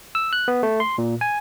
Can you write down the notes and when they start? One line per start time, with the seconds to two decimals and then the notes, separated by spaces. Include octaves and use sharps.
0.15 E6
0.33 F#6
0.48 B3
0.63 A3
0.80 C6
0.98 A#2
1.21 G#5